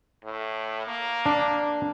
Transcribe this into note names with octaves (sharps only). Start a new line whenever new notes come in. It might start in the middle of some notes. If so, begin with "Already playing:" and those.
A2
A#3
D4